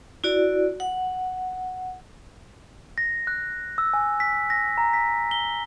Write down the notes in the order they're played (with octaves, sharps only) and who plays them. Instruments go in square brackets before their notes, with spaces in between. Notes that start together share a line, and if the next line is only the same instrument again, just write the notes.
[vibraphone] E4 F#4 D5
F#5
[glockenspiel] A#6
F#6
E6
G#5
B6
A#6
A#5
B6
G7